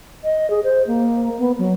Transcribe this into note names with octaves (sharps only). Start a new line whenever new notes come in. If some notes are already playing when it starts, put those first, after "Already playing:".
D#5
G#4
C5
A#3
B3
F#3